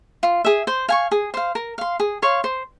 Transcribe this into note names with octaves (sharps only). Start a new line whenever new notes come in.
F4
G#4 E5
C5
F5 G#5 C#6
G#4
C5 F5
A#4
F5 C6
G#4
C#5 F5 C6
C5